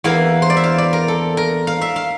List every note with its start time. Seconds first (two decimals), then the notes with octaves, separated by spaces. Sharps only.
0.04 E2 E3 A#3 F5
0.42 C5
0.50 D5
0.57 E5
0.64 F5
0.78 D5
0.93 A#4
1.08 A4
1.37 A#4
1.67 F5
1.81 E5
1.96 F5